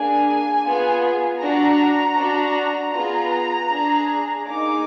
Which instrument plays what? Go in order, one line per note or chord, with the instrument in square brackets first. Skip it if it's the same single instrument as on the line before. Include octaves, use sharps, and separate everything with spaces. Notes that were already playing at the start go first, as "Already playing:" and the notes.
Already playing: [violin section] A#3 D4 G#4 G#5
B3 F4 G#4
D4 F#4 A#5
D4 F#4
B3 F4 G#4 A#5
D4 G#4
A#3 D#4 G#4 D6